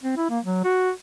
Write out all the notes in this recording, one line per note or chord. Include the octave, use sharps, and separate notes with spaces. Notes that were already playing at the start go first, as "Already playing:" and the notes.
C4
E4
A#3
F#3
F#4